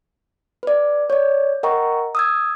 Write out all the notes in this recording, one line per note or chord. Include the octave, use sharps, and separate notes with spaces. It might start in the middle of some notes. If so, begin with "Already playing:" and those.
B4 D5
C#5 D5
A#4 D#5 F#5 G5 A#5 C#6
D#6 E6 G#6